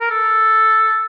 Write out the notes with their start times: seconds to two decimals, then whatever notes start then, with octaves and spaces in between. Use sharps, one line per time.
0.01 A#4
0.10 A4